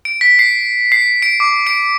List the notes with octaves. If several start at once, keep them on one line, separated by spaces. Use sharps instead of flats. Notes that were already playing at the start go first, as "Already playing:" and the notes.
D7
B6
C7
C7
D7
D6
D7